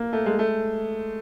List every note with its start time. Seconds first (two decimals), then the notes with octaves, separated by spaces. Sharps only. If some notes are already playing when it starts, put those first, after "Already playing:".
Already playing: A#3
0.13 A3
0.26 G#3
0.39 A3